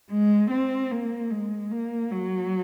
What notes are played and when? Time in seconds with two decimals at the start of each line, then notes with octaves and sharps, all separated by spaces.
0.11 G#3
0.51 C4
0.91 A#3
1.31 G#3
1.72 A#3
2.12 F#3